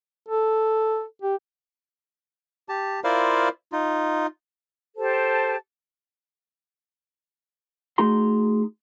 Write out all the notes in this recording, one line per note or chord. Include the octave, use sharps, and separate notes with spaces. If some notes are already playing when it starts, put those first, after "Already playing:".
A4
G4
G4 A5
E4 F4 A#4 C5 D5 F5
D#4 F4
G4 A4 C5 A5
A3 D#4 F#4 G#4 A#5 C6